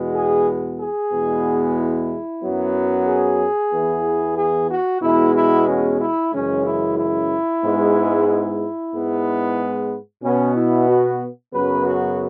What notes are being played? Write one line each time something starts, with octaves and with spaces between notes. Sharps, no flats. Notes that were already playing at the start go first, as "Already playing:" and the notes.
Already playing: E2 B2 G#3 B3
G#4
G#4
E2 B2 G#3 B3
E4
F#2 F#3 B3
G#4
E2 E3 B3
G#4
F#4
E2 B2 G#3 B3 E4
E4
C#4
E4
F#2 C#3 E3 G#3 C#4
E4
E4
G#2 G#3 B3
E4
G#2 G#3 B3
B2 B3 C#4
E4
F#4
F#2 C#3 F#3 B3 B4
F#4